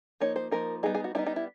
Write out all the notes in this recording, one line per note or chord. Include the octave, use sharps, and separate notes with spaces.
F3 A#3 D#4 C#5
C5
F3 A#3 D#4 A#4
G3 B3 D#4 G#4
G#4
F#4
G3 B3 D#4 E4
D#4
E4